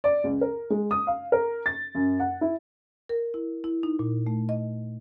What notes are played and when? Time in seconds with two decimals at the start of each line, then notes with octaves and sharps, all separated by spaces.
0.04 D5
0.24 C#2
0.41 A#4
0.70 G#3
0.91 D#6
1.07 F5
1.32 A#4
1.66 A6
1.95 F#2
2.20 F#5
2.41 E4
3.09 A#4
3.34 E4
3.64 E4
3.83 D#4
3.99 A#2
4.27 A3
4.49 D#5